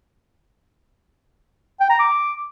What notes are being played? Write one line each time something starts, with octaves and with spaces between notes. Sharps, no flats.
G5
A#5
D6